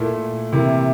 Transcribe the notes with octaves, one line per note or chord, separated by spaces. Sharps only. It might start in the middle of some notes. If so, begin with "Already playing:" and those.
Already playing: A#2 A3 E4
C3 E3 A#3 E4